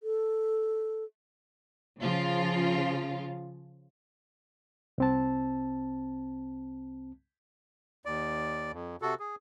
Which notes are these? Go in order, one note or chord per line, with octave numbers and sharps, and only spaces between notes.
A4
C#3 F3 F4
C2 C4 A5
D#2 D5
F2
C3 F#4 A4
G#4